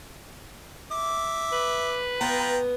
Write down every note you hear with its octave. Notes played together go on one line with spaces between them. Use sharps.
E5 D6
B4
B3 F4 G5 A#5